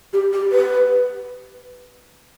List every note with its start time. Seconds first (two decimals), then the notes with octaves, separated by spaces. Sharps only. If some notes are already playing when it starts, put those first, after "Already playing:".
0.13 G4
0.33 G4
0.52 B4